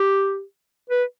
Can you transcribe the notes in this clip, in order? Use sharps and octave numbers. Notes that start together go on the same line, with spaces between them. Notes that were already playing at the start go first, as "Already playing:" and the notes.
Already playing: G4
B4